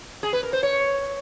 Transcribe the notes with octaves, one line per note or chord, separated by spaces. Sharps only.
G#4
B4
A#4
C5
C#5